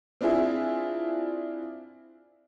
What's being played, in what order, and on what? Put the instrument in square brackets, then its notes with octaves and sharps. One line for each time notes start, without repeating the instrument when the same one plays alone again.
[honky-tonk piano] C4 D4 E4 F4 G#4 E5